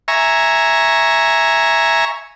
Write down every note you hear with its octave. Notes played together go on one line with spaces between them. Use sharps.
E5 G#5 A#5 C#6